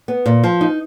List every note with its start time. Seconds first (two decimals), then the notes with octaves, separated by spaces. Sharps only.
0.08 B3
0.26 A#2
0.44 F3
0.61 D#4